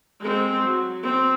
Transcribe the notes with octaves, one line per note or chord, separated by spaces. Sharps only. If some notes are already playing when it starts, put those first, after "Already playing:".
G#3 C4
F#3
C4